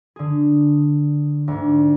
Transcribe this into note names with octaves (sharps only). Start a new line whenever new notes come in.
D3 G#4
D2 G#2